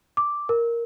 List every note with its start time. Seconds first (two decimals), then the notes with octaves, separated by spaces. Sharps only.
0.17 D6
0.49 A#4